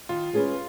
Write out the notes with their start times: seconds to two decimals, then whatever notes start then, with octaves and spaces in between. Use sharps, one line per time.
0.09 D#3 F4
0.33 G#3 C#4 G#4 B4